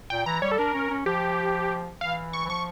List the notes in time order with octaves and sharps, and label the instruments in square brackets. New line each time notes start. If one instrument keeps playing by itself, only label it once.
[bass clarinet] A#2 [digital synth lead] G5
[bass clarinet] E3 [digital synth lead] A#5
[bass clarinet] G3 [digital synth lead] C#5
[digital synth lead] A4
[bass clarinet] D4 [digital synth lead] A#4
[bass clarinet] C#4
C#4
[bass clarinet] F3 [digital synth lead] G4
[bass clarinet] E3 [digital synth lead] F5
[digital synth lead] C#6
[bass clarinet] E3
[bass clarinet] F3 [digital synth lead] C#6